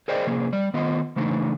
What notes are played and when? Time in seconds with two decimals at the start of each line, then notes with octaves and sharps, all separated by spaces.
0.08 G#4 A#4 C5 D5 D#5 G5
0.27 C3 F3 A#3 G#4
0.53 G3 D5
0.74 D#3 B3 F4 D#5
1.16 C#3 E3 A3 D4 D#4